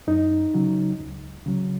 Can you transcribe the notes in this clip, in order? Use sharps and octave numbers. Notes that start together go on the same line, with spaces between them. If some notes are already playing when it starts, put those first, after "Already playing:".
F#2 D#4
C#3 F#3
C#2
C#3 F#3